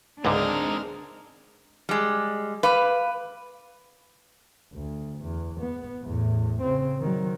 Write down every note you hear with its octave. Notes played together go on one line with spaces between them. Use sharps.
C#2 G#2 D3 G#3 C4 D4 D#4 A#4
G3 G#3
B4 F5 B5 D6
D2
E2
B3
E2 A2
C#3 C4
D#3 F#3